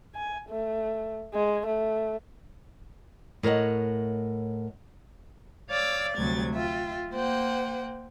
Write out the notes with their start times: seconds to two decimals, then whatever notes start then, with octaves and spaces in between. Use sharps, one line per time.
0.15 G#5
0.49 A3
1.34 G#3
1.66 A3
3.43 A2 A#4 C#5 D#5 F#5
5.70 C#5 D5 F5 D6 E6
6.17 D2 C3 F#3 G3 G#6 A6
6.53 F4 E5 G5
7.12 A#3 C5 F#5 G5